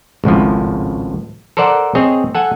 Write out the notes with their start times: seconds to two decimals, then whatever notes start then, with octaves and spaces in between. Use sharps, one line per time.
0.24 G#1 C#2 A2 F3
1.57 A4 A#4 C5 D5 F#5
1.95 C4 G#4 C#5 D#5
2.35 A4 F#5 G#5